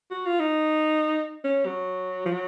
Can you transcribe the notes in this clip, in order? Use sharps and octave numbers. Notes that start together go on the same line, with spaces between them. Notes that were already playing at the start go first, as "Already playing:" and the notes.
F#4
F4
D#4
C#4
F#3
F3
F#3